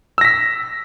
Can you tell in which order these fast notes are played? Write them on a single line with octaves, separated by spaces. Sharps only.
E6 A#6 B6